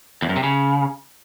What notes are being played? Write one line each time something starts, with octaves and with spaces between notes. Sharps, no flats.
E2
F#2
C3
C#3